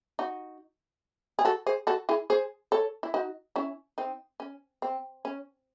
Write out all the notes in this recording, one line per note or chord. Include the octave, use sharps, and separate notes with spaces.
D#4 F#4
G#4
F#4 A4
G#4 C5
F#4 A4
E4 G#4
G#4 C5
A4 C#5
E4
D#4 F#4
C#4 E4
C4 D#4
C#4
C4
C#4